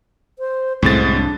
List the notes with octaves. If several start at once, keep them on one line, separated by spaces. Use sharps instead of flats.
C5
C2 F#2 A2 C3 G#3 C4 A6
D4